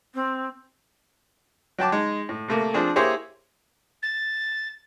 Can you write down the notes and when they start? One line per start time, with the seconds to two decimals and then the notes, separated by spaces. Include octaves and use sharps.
0.14 C4
1.78 F#3 G5 A5 D6
1.92 G#3 D#4
2.29 A2
2.48 C3 A3 A#3
2.74 F3 C4 D4 G#4
2.96 A#3 E4 G4 G#4 C5 C#5
4.02 A6